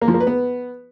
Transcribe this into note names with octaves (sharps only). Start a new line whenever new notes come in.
A#3
F3
A#3
B4
B3